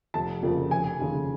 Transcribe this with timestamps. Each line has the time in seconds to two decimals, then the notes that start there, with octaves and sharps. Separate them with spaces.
0.14 F1 A5
0.43 F2 C#3 F3 A#3
0.71 F1 G#5
1.00 D#2 C#3